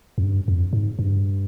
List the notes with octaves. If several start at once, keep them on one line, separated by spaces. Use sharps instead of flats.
F2
G2
F2
G#2
G2